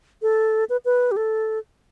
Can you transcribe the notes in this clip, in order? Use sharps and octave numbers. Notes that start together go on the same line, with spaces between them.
A4
B4
B4
G4
A4